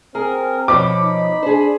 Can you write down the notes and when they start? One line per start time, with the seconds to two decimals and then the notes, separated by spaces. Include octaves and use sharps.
0.15 C4 G#4 A#4
0.68 B2 F3 C#5 B5 D6
1.03 D#4
1.43 D4 G#4 C5